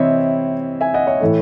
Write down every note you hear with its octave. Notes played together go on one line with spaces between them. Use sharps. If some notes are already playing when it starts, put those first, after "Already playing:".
Already playing: C3 E3 C4 E4 C5 C#5 D#5 E5
E5 G#5
D#5 F#5
C#5 E5
A2 E3 A3